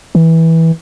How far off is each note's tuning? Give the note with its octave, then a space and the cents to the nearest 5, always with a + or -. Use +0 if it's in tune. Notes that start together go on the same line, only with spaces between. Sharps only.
E3 -15